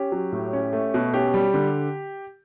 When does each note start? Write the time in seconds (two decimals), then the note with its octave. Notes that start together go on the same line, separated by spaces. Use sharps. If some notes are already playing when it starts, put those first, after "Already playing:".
Already playing: C#4 G4
0.12 F#3
0.32 A2
0.53 C#4
0.73 A3
0.94 B2
1.14 C#4 G4
1.34 G3
1.54 D3